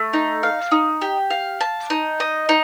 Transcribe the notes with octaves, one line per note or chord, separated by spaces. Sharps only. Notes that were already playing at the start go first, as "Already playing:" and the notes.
Already playing: A3
D#4
F5
D#4
G4
F5
A5
D#4
D#5
D#4